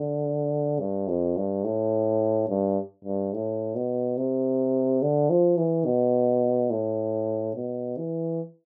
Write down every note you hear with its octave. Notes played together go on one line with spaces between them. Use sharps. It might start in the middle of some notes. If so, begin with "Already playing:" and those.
Already playing: D3
G2
F2
G2
A2
G2
G2
A2
B2
C3
D3
F3
E3
B2
A2
B2
E3